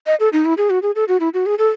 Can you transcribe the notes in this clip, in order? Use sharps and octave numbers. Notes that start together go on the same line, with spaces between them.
D#5
A4
D#4
E4
G#4
F#4
G#4
A4
F#4
E4
F#4
G#4
A4